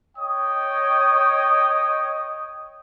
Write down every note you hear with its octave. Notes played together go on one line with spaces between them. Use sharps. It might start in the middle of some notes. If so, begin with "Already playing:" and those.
C#5 D#5 G5 D#6